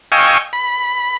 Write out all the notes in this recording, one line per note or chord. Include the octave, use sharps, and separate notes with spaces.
D#5 F5 G5 G#5 C#6 E6
B5